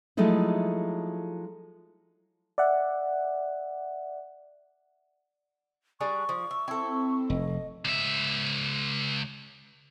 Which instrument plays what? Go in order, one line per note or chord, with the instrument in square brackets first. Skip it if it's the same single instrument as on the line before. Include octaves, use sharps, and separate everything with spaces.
[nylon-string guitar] F3 F#3 G#3 A3 D#4 E4
[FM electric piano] D5 E5 F#5
[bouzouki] G3 D4 G#4 [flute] C#6
[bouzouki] F3
E5
[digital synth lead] C4 [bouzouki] E4 A4
[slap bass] F1 [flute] D#5
[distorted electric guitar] C#2 E5